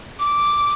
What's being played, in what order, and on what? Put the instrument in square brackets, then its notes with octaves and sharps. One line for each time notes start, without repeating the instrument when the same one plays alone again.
[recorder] D6